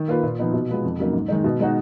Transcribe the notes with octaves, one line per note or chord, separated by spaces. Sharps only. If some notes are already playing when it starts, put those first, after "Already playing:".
Already playing: D#3
A#3 F4 B4
A#2
F3 B3 D#4
B2
G#3 B3 F4
F2
C#3 F#3 A#3 D#4
G#2
D#3 G#3 D#4
B2
G#3 D#4 F#4